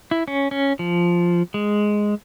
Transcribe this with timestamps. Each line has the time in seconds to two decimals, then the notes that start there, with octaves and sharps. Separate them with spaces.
0.11 E4
0.28 C#4
0.51 C#4
0.79 F3
1.54 G#3